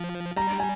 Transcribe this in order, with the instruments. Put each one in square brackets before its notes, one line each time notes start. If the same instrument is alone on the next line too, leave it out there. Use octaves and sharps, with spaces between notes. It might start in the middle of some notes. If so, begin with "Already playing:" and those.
Already playing: [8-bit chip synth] F3
[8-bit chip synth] G3 [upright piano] A#5
[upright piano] G#5